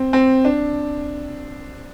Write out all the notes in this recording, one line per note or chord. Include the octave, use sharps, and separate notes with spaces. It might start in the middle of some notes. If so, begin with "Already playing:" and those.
Already playing: C4
C4
D4